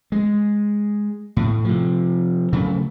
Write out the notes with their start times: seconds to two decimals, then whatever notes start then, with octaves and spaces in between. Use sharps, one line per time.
0.12 G#3
1.37 A2
1.65 C3 F3
2.53 C#3 F#3 A3